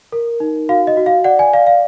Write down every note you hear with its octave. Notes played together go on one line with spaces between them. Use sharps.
A#4
D#4
F#4 F5
D#5
F#4
F5
D5 F#5
G#5
D5 F5
F5